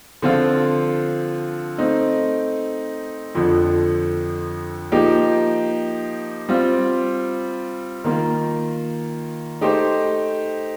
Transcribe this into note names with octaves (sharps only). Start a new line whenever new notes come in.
D3 F3 C4 F4
A3 C4 D#4
F2 D3 F3
F3 A#3 D#4 G4
G3 C4 F4
D#3 A#3 F4
A3 D#4 G4 C5